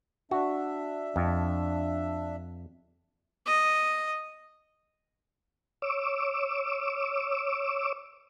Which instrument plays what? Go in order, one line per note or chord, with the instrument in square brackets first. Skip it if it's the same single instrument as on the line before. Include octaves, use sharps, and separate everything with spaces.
[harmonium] D4 E5 [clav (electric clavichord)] F#4
[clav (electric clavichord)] F2
[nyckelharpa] D#5
[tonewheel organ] C#5 D6 E6